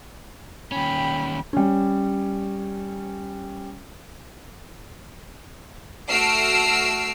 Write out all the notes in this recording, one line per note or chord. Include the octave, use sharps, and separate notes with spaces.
D#2 C#4 G5 B5
G3 C#4
A3 F#4 E6 F6 C7 D7